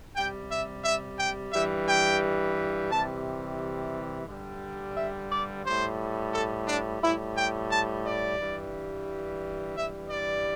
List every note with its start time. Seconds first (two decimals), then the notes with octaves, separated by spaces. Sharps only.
0.16 C3 G3 G5
0.51 E5
0.85 E5
1.19 G5
1.53 G2 E3 G3 E5
1.88 G5
2.90 C3 E3 G3 A5
4.28 G2 D3 G3
4.97 E5
5.31 D5
5.65 A2 G3 C5
6.33 A4
6.68 D4
7.02 A2 G3 E4
7.37 G5
7.70 A5
8.05 D5
8.39 G2 E3 G3
9.76 G2 E3 G3 E5
10.10 D5